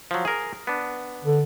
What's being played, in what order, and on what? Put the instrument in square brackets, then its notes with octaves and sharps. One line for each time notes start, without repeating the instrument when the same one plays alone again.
[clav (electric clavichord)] F3 F#3
G#4 A#4
B3 D4
[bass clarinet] D3